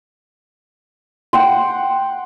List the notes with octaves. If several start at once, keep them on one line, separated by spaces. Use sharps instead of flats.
F#5 G5 C6